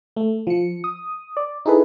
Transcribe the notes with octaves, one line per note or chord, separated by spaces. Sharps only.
A3
F3 C#7
D#6
D5
D#4 E4 G#4 A4 B4